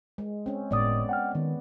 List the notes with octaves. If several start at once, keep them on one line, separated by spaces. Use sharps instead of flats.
G#3
C4 C#4
G1 A2 G#3 B3 D5 D#6
F#5 G5 F6
D#3 B3